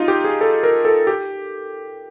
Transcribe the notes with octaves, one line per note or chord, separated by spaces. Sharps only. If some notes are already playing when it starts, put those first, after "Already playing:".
Already playing: D#4 F4
G4
G#4
A4
A#4
A4
G4